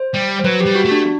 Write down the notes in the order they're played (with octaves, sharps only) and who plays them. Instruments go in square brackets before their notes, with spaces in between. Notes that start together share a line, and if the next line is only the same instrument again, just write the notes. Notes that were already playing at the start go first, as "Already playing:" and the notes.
Already playing: [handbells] C5
[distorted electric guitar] G3
[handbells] C5
[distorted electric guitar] F#3 [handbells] B4
[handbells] G4
[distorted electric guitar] G3
[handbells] F#4
[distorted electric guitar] A3
[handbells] D4